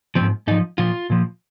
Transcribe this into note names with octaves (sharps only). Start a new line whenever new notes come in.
G#2 F3 C4
G#2 F3 D#4
A#2 F3 F4
A#2 F3